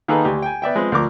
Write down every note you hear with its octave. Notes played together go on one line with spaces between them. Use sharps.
D#3 A#3 D#4 G#4 A4 B4
D2 G4 G#5
G5 G#5
B3 D5 E5 G5
F3 G#3 C4 B4
D2 F3 A#4 D6